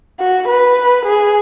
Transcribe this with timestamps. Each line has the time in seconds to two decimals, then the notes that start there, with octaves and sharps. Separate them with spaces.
0.20 F#4
0.48 B4
1.06 G#4